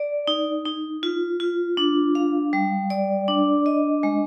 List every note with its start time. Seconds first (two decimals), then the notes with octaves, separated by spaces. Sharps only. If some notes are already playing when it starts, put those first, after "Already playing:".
Already playing: D5
0.28 D#4
0.65 D#4
1.03 F4
1.40 F4
1.77 D4
2.15 F5
2.53 G3
2.90 D5
3.28 D4
3.66 D#5
4.03 G#3